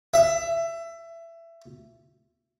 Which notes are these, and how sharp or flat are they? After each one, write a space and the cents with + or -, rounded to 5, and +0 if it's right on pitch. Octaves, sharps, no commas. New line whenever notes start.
E5 +20